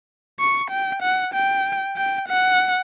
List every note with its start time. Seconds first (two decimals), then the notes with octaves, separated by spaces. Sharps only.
0.40 C#6
0.71 G5
1.03 F#5
1.34 G5
1.97 G5
2.29 F#5